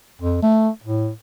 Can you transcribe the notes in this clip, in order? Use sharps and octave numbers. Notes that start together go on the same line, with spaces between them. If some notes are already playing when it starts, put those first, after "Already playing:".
F2
A3
A2